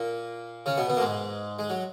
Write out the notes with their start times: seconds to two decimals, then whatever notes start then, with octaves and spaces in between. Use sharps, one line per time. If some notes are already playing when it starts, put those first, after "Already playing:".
Already playing: A#2 A#3
0.66 C#3 C#4
0.77 B2 B3
0.89 B2 B3
0.97 A#3
1.00 G#2 G#3
1.59 G#3
1.70 F#3